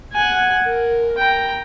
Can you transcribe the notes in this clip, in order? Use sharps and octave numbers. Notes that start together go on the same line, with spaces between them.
F#5 G#5
A#4
G5 A#5